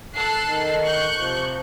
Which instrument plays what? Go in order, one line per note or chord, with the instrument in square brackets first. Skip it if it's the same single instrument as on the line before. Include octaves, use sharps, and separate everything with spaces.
[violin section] A4 F#6 C7
[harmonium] D#3
[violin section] C#6 F#6 G6
[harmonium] C3 F3